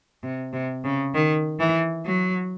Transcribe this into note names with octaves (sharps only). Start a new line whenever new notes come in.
C3
C3
C#3
D#3
E3
F#3